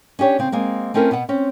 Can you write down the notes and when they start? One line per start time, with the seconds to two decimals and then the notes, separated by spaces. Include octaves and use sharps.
0.19 C#4 D4 G4 C#5
0.39 C#3 C4
0.52 G#3 A#3 C4
0.94 A3 C4 C#4 E4 A#4 B4
1.11 B2 B3 B4 F#5
1.29 C4 C#4